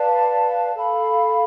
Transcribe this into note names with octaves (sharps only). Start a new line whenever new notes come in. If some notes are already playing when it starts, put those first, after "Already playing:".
Already playing: B4 D5 F5 A5
A4 F5 B5